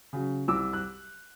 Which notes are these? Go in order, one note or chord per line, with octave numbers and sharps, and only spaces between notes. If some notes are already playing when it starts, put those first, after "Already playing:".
C#3 F#3
C2 D6 E6
F#6